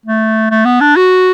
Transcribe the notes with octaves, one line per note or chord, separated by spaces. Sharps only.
A3
A3
B3
D4
F#4